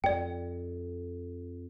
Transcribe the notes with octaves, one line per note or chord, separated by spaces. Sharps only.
F2 D5 G5